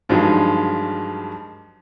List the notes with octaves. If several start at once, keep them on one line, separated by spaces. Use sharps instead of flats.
G2 D#3 F3 F#3 G#3